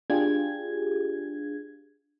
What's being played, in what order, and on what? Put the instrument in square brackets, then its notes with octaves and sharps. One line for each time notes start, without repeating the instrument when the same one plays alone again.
[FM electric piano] D4 F4 G4 G#4 G#6